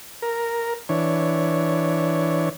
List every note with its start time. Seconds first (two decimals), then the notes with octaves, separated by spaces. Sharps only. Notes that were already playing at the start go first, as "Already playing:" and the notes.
0.22 A#4
0.89 E3 D4 C#5